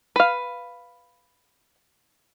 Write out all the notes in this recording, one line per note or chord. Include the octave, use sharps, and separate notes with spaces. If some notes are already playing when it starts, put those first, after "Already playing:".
B4 F5